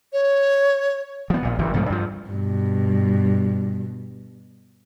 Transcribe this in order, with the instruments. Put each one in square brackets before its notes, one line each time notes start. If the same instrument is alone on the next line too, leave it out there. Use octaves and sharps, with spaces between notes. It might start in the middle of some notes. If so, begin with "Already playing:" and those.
[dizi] C#5
[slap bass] F3 B3
A#1 A#2
F#1 G2 E3
C2 G#2 F3 A3
G2 F3
[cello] G2 B2